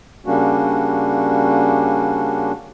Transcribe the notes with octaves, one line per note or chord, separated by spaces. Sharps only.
C#3 G3 A#3 C#4 D4 F#4